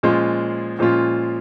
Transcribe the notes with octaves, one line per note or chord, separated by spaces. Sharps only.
A#2 F3 G#3 C#4 F4
A#2 F3 G#3 C#4 F4